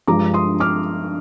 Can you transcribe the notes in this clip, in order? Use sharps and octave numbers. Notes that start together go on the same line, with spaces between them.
G2 F3 G#3 A#5 D6
C6 D#6
D6 F6